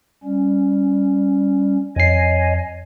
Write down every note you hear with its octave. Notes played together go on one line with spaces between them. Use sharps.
G3 C#4
F2 C#5 D#5 G#5 C7